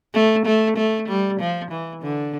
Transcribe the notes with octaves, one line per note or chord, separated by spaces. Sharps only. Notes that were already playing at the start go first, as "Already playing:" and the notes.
A3
A3
A3
G3
F3
E3
D3